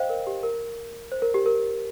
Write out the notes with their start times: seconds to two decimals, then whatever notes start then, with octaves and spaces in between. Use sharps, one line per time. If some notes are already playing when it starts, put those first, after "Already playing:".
Already playing: C5 D#5 F5 G5
0.09 A#4
0.27 G4
0.43 A#4
1.12 C5
1.22 A#4
1.34 G4
1.46 A#4